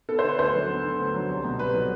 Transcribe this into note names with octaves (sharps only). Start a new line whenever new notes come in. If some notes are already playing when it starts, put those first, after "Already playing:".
B3 A4
C5
D3
B4
D2 C5
F#3
B3
D3
D2
F#3
C2
B2
C2 B4
F#3